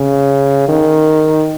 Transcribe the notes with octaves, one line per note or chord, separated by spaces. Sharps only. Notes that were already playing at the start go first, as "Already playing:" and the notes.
Already playing: C#3
D#3